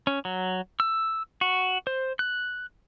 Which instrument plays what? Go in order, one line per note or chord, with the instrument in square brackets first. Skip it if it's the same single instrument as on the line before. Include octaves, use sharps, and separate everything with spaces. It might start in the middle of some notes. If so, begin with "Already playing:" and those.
[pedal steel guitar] C#4
F#3
E6
F#4
C5
F#6